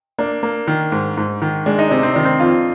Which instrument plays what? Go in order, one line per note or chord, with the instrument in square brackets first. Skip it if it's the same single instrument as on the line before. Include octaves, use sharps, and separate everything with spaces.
[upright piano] A#3 [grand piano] D4
[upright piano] A#3
D#3
G#2
G#2
D#3
[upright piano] G#3 [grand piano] D4
[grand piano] D#4
[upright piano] C3 [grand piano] D4
[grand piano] C4
[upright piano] D#3 [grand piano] D4
[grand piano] C4
[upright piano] F2 [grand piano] F4